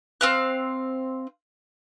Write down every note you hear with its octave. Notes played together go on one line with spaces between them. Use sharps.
C4 F5 F#6